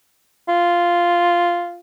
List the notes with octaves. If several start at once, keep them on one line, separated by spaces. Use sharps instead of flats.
F4